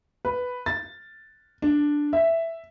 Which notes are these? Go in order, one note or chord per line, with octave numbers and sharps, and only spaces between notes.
B4
A6
D4
E5